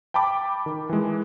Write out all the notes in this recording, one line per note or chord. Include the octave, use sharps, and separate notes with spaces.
G5 A5 B5 D6
D#3
E3 G#3